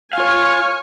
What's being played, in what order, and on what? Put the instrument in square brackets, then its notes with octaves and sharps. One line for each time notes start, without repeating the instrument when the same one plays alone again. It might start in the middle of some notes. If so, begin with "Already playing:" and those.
[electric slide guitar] F4 F5 [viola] C#5 G#5 [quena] F6